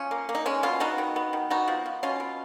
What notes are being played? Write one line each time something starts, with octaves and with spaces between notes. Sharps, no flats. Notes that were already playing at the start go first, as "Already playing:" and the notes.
Already playing: F3 C#4
A#3
A#3
D#4
G#3 C#4
B2 C#4 F4
B3 D#4 F#4
D#3
B3
D#3
B3 D#4 F#4
F3
F3
B2 C#4 F4
B2